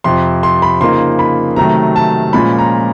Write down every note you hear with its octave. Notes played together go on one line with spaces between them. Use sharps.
F2 C3 F3 C6
C6
B5
C#3 F3 A#3 D#4 C6
B5
C3 D#3 F#3 A3 A#5
A5
A#2 F3 G#3 C#4 B5
A#5